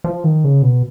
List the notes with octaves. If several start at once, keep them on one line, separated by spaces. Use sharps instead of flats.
F3
D#3
C#3
B2